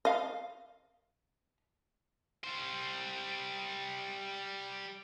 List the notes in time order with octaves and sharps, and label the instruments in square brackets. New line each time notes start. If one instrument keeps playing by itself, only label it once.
[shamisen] D#5 F5
[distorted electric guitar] G3 C5